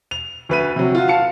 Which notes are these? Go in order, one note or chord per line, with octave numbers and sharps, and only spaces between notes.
F7
D2 B4 D#7
C3 F#3
F4 F#4
F5 A5 C#7